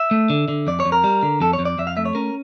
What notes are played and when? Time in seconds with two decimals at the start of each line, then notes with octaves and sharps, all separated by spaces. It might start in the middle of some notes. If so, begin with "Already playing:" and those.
Already playing: E5
0.11 A3
0.30 D3
0.48 D3
0.67 F2 D5
0.80 C#5
0.85 F2
0.92 A#4
1.04 G3
1.23 D3
1.40 F2 A4
1.53 C#5
1.59 F2
1.65 D5
1.78 F2 E5
1.87 F5
1.97 A3 E5
2.05 C#5
2.15 C#4 A#4